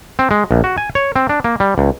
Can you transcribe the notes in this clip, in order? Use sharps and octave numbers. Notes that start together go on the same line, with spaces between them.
C4
G#3
A#1
F#4
G#5
C#5
C4
D4
A#3
G3
C#2